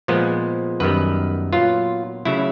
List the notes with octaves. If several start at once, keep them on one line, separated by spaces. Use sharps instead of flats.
A#2 F3 G#3 B3
F#2 D#3 G3 B3 B4
A#2 F#3 B3 F4
C#3 F#3 A3 E4